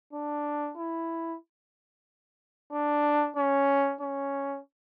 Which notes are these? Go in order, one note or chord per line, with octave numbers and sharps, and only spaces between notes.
D4
E4
D4
C#4
C#4